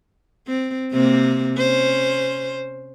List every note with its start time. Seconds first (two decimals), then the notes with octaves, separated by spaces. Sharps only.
0.47 C4
0.92 C3 A#3 C4
1.56 C#4 C5